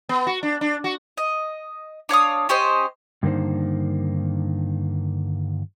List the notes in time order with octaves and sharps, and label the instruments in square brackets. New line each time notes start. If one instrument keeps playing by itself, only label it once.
[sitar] B3
F#4
D4
D4
F#4
[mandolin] D#5
D4 C#5 F5 D#6
C#4 G4 C5 D#5
[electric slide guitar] G2 D3 D#3 A#3 D#4 C5